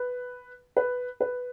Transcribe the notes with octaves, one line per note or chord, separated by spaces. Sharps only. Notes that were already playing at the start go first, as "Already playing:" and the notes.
Already playing: B4
B4
B4